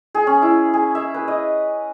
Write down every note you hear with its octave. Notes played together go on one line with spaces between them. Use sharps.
G#4
C#4
E4
G#4
E5
B4
D#5